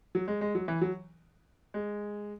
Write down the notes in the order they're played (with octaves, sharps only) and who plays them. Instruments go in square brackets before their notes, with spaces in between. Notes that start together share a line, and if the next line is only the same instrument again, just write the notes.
[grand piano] F#3
G#3
G#3
F#3
E3
F#3
G#3